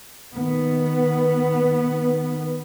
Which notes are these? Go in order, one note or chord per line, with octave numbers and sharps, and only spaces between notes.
D#3 B3